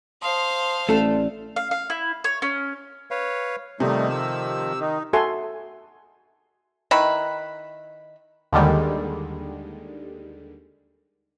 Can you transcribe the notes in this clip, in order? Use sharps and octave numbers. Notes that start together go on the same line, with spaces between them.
C5 F5 A5 C6 D#6
A1 A3 A4 D5
F5
F5
E4
C#5
C#4
B4 C#5 F5
C3 D#3 F3 G3 A3 D#4
E6
D#3 D#4
F#4 A4 E5 G#5 C6
D#3 E4 B4
D#2 D3 D#3 G3 G#3